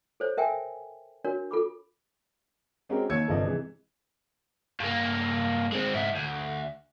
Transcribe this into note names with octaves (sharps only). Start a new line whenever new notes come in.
A4 C5 C#5
A#4 E5 G5 G#5
D4 F#4 A#4 C#5
F4 A4 B5 D6
G#3 C4 C#4 F#4 G4 A#4
D#2 D#3 C#5 E6 G#6 C#7
G1 C3 F3 D5 D#5
C3 E3 G#3
G2 A#3
G#3 C4
G#2 E4
D2